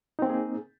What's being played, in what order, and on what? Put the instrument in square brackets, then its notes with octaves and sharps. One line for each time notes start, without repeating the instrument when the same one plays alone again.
[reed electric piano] D#4
C4
A#3
G#4